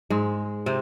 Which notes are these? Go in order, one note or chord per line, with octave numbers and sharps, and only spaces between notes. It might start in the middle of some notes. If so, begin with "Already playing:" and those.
G#2 G#3
C3 C4